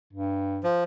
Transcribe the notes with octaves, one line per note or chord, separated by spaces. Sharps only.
G2
F3